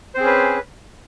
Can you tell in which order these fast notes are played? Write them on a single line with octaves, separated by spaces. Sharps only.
C5 C4 G#4 C#4 B4